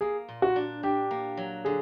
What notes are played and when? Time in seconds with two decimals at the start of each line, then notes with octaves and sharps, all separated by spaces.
0.01 A#3 G#4
0.28 A#2
0.42 F#4
0.56 D4
0.83 D4 G4
1.11 A#3
1.37 F#3
1.65 D3 G#4